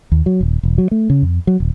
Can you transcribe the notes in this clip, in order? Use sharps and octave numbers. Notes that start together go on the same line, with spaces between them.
D#2
F#3
D#1
E1
F#3
A3
C#3
F2
F#3
D#1